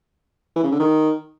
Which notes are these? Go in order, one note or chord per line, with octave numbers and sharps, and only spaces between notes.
E3
C#3
D3
D#3